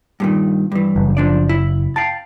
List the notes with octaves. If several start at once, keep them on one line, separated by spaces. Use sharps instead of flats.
G2 A#2 D#3
G2 E3
F#1
F3 D4 D5
E4
F5 G5 A5